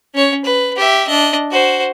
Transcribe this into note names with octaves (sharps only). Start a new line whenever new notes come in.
C#4 C#5
B4
G4 E5
D4 D#5
F#4 C5